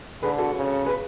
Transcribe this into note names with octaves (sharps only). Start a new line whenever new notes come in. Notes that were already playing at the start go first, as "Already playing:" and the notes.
D3 G#4 B4
F#4 A4
C#3
G#4 B4